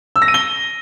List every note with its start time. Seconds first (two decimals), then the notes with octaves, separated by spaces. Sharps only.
0.16 E6
0.22 A#6
0.28 D#7
0.34 G7